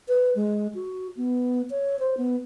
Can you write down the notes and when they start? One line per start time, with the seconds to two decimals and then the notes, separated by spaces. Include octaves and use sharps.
0.08 B4
0.35 G#3
0.75 F#4
1.17 B3
1.70 C#5
1.99 C5
2.17 B3